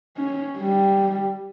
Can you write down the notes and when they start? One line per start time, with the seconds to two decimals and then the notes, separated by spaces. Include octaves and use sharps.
0.17 C#4
0.58 G3